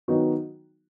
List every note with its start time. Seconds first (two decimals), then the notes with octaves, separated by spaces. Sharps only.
0.08 D#3 F#3 B3 D#4 F#4